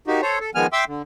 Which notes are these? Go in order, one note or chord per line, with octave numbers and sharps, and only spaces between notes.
A#3 D#4 F#4 G4
A4 C5 C#5
A4
D#3 F3 G#3 B3 G#5 F6
E5 G5 C6 D6 E6
D3